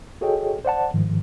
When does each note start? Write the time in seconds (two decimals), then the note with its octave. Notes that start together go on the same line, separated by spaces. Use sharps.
0.21 F#4 G#4 A4 C#5 D#5 G5
0.65 C5 D5 F#5 A5
0.94 G#2 D#3 F3